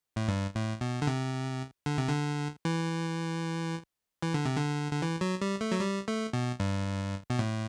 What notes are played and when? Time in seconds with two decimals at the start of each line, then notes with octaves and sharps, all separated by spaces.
0.16 A2
0.28 G2
0.55 A2
0.81 B2
1.02 D3
1.07 C3
1.86 D3
1.98 C3
2.09 D3
2.65 E3
4.22 E3
4.34 D3
4.45 C3
4.56 D3
4.92 D3
5.02 E3
5.21 F#3
5.41 G3
5.61 A3
5.72 F#3
5.81 G3
6.08 A3
6.33 B2
6.60 G2
7.30 B2
7.39 A2